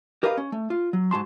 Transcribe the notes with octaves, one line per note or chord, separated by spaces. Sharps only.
G4 A#4 B4 D#5 F5
C#4
A3
F4
F#3
G#2 F#4 A5 C6